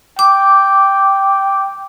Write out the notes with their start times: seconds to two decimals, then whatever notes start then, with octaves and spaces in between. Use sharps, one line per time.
0.19 G5 D6